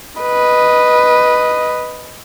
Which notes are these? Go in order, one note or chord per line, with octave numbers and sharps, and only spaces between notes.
B4 D#5